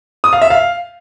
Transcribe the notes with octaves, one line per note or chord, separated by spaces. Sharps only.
D#6
F5
E5
F5